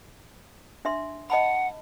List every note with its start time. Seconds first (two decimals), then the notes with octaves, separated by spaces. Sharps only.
0.85 D4 E5 C6
1.30 D#5 F#5 A5 B5